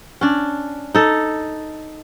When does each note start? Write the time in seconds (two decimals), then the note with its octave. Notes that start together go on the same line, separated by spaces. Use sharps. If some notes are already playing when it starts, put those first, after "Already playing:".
0.21 C#4 D4
0.95 D#4 A4